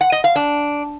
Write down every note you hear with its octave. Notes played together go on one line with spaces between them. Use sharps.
F#5
D#5
F5
D4